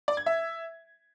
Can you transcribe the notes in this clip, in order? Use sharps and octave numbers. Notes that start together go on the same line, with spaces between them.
D5
G#6
E5